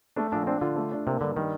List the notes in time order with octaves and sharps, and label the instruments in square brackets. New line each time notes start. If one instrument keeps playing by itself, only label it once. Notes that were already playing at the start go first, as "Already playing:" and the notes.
[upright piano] A3 [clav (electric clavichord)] D4
[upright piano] A#1 [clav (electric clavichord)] D4
[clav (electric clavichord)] C4 [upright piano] D4
[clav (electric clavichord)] D3 [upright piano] F4
[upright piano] A3
D4
[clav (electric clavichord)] C3 [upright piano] A#3
[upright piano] G2 [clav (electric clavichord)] D3
[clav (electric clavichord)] D#3 [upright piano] G3